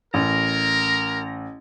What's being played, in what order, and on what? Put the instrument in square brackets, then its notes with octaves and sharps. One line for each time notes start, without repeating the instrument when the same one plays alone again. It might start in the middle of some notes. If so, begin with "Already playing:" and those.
[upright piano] A1 [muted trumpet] A#4 [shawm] A#5